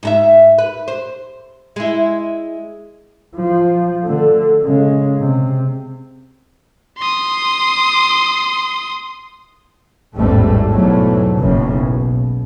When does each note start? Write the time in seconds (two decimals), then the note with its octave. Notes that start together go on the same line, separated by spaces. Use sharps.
0.03 G#2 A#4 E5
0.58 B4
0.88 C5
1.76 G#3 E4
3.36 F3
4.04 D3 A3
4.64 C#3 G#3
5.19 C3
6.98 C6 D#6
10.16 A1 E2 G#2 G3 A3
10.71 B1 E2 G#2 F#3 A3
11.39 F#1 B1 F#2 A2 C#3
11.87 B2